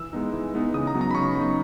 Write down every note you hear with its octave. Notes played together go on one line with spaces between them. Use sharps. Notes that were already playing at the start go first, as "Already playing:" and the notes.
Already playing: E3 E6
G#3 B3 D#4
E3
G#3 B3 D#4
C#3 D#6
A#5
F#3 B3 D#4
A#5
B5
C#3 C#6
F#3 B3 D#4